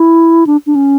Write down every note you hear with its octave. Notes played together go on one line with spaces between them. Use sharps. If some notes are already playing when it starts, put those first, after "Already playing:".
Already playing: E4
D4
D4
C#4